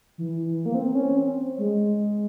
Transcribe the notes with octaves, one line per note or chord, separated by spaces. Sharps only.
E3
E3
A#3
C4
C4
C#4
C4
G#3